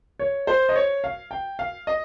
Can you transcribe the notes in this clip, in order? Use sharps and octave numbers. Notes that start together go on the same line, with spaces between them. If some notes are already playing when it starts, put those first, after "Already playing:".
C#5
C5
D#5
C#5
F5
G5
F5
D#5